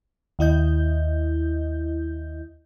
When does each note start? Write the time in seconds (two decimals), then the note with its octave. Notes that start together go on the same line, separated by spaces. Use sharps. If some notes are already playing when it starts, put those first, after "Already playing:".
0.39 D#2 E4 D#5 G6